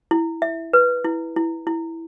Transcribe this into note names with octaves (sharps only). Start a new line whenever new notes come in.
E4
E5
B4
E4
E4
E4